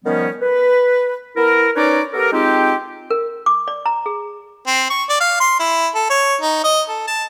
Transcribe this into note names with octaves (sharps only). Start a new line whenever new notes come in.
D#3 F3 G3 B3 C#4
B4
B3 E4 A#4
C#4 D#4 B4 C#5 D5
B3 G4 A4 A#4
G#3 C4 D#4 F4 G4
A#4
D6
D5
A#5
G#4
C4
C#6
D5
F5
C6
E4
A4
C#5
D#4
D#5
A4
A5